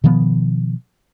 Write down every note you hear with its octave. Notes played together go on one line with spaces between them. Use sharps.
B2 D#3 F3 B3